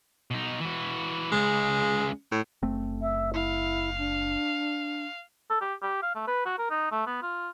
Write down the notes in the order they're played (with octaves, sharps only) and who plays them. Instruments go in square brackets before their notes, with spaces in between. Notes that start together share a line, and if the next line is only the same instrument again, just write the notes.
[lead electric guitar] B2 D#4
E3 F#4
[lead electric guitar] C#2 C#3 [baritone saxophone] G#3
[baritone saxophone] A2
[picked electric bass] F#1 A3 C4
[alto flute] E5
[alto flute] E4 [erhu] F5
[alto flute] D4
[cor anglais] A4
G4
G4
F5
A3
B4
F#4
A#4
D#4
A3
B3
F4